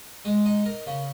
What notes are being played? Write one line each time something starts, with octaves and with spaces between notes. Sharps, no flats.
G#3
D#4
A#4
C#3